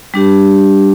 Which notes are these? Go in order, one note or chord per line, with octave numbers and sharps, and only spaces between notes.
G3 D4 G4